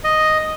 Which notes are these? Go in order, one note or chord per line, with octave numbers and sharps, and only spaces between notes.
D#5